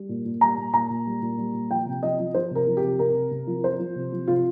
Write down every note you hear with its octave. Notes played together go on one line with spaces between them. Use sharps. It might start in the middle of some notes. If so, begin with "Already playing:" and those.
Already playing: G3
A#2
A#2
G3 A#5
A#2
A#2 A#5
A#2
G3
A#2
G3
A#2
F3 G5
C3
F3 D#5
F3
F3 C5
C3 A#4
F3
G4
C3
C3 A#4
C3
C3
F3
F3 C5
F3
C3
F3
C3 F4